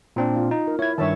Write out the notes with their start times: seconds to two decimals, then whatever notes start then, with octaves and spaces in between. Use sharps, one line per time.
0.16 A#2 C4 D4
0.36 F4
0.51 D#4
0.67 A#4
0.79 E4 C#5 G#6
0.98 G2 D#3 C#5 E5 A5